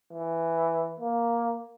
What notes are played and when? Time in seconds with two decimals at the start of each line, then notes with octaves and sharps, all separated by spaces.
0.13 E3
1.00 A#3